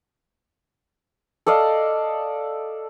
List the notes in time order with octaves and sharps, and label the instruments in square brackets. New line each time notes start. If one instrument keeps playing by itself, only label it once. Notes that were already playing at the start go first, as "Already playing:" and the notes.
[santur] A4 D5 D#5 F5